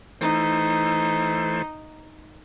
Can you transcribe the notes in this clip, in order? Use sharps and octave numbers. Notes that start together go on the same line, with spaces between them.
E3 A3 D#4 C5